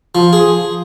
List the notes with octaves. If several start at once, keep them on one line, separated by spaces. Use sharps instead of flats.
F3
G#4